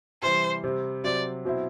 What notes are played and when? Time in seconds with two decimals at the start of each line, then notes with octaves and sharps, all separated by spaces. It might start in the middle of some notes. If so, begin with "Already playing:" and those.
0.22 C3 E3 G3 C5
0.64 C3 G3 C4
1.04 C3 F#3 C4 D5
1.45 B2 F#3 C4 E4